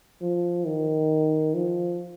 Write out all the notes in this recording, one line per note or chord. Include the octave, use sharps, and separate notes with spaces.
F3
D#3
F3